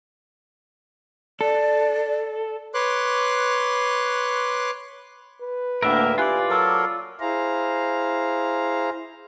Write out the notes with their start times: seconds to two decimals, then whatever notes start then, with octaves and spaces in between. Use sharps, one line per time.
1.41 A4 D5
2.74 B4 C#5 C6 D6 F#6
5.42 B4
5.83 D2 A2 A#3 D4 A#4 E5 F#5 E6
6.18 E4 F4 G4 D5 G#5 F#6
6.50 F#3 A4 A#4 D6 E6
7.20 E4 G#4 C5 F5 A#5